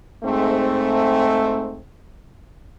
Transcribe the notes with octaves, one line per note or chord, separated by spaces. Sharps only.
G#2 A3 C4